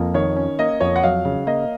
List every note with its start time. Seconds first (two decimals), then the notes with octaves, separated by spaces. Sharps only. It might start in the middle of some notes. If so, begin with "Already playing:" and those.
Already playing: F2 A#3
0.14 D#3 C#5
0.37 C#4
0.59 A#3 D#5
0.80 F2 C#5
0.96 F#5
1.04 F#3 F5
1.25 C#3
1.47 A#3 D#5